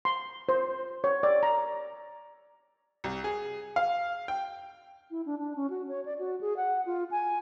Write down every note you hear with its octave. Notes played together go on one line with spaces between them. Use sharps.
C6
C5
C#5
D5
A#5
C2
G#4
F5
G5
E4
D4
D4
C#4
F#4
C#5
D5
F#4
G#4
F#5
F4
G#5